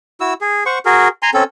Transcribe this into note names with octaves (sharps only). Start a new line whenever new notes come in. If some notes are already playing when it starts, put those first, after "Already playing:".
E4 F#4 E6
G#4
C5 F#5 C#6
F#4 G#4 A#4
G#5 A#5 C6
C4 C#4 A4